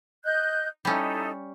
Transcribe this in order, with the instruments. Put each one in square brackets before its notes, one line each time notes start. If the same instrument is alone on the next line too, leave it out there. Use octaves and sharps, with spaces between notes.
[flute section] D#5 F#6 G6
[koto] G3 C#4 [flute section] D#4 E4 A4